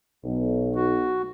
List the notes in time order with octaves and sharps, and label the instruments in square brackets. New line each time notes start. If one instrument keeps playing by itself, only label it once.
[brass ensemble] B1
[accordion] F#4